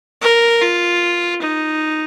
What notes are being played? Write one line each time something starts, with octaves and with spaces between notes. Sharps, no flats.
A#4
F4
D#4